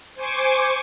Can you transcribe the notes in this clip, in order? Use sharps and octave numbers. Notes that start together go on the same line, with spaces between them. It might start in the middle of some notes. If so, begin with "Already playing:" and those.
C5 G#5 C#6 D6